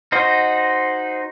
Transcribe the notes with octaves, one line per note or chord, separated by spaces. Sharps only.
D#4 F#4 C5 D#5